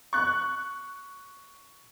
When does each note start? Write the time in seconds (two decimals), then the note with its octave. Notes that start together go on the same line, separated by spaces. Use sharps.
0.13 C#6 F#6